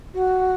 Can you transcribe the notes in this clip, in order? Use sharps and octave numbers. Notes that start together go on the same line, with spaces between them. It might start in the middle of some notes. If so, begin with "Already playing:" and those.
F#4